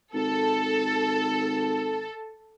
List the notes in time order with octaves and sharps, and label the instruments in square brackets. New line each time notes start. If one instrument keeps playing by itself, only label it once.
[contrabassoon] G#1 [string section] A4